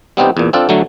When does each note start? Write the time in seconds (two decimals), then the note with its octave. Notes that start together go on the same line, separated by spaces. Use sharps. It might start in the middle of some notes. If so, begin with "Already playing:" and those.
0.17 G3 B3 C4 D#4 G4
0.37 E2 A#2
0.53 C4 D4 F4 A4
0.69 D3 F#3 A3